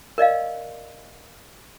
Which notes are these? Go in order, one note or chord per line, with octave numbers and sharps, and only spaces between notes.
A#4 D5 D#5 F5